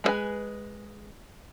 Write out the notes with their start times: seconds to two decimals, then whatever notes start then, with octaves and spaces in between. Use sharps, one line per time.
0.04 G#3 F4 G#4 B4 G#5